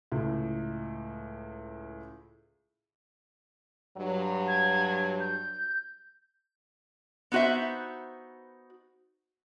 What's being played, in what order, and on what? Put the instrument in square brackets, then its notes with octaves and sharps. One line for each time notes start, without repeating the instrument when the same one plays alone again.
[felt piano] C#2 A2
[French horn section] G2 F#3
[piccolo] G#6
G6
[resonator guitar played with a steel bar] B3 D#4 F#4 C5 E5